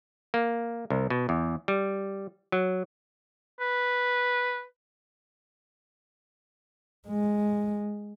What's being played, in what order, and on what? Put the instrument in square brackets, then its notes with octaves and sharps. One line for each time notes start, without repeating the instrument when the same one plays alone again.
[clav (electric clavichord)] A#3
C2
B2
E2
G3
F#3
[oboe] B4
[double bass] G#3